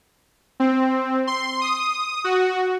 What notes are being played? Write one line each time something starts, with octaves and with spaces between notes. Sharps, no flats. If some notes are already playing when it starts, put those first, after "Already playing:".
C4
C6
D#6
F#4